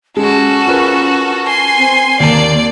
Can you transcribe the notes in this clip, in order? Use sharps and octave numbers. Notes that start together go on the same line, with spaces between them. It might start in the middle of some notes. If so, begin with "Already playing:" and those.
G#3 C#4 F#4 A4
F4 A#4 B4
G#5 C6
C4
D#2 A#3 D5 A5